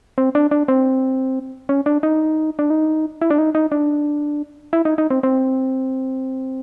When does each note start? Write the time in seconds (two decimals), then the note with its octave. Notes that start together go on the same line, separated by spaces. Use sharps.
0.18 C4
0.35 D4
0.51 D4
0.68 C4
1.69 C#4
1.86 D4
2.03 D#4
2.59 D4
2.70 D#4
3.21 E4
3.30 D4
3.38 D#4
3.55 D#4
3.72 D4
4.73 E4
4.85 D#4
4.98 D#4
5.10 C4
5.23 C4